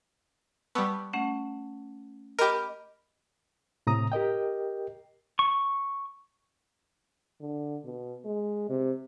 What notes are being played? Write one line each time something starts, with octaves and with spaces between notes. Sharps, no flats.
G3 B3 A5 C#6 E6
A3 C#4 F#5
G4 A#4 D#5 B5 F6
A2 C3 A#5 D#6
G4 A#4 D#5 G5
C#6
D3
B2
G#3
C3